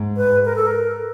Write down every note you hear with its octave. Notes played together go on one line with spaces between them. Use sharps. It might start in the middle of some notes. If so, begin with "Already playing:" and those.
Already playing: G#2
B4
A#4
A4
A#4